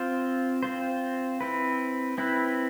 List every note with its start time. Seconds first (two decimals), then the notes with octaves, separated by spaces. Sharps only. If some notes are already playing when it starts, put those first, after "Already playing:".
Already playing: C4 F4 C5
0.63 C4 F4 C5
1.41 C4 E4 B4
2.18 C4 E4 B4